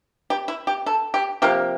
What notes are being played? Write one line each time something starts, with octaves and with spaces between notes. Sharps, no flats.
G4
E4
G4
A4
G4
C3 F3 A#3 G4